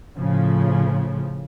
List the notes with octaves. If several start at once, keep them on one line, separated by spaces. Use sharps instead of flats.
A2 C#3 F3